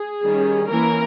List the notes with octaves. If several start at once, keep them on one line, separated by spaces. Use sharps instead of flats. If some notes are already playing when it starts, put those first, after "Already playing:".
Already playing: G#4
D#3 G3 C#4
E3 A#3 C#4 A#4